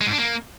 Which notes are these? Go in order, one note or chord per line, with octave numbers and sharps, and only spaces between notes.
G#3
G#2
D4
A#3